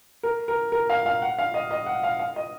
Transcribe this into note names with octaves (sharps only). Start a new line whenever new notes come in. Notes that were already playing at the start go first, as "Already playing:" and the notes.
A#4
A#4
A#4
F5
F5
F#5
F5
D#5
D#5
F#5
F5
F5
D#5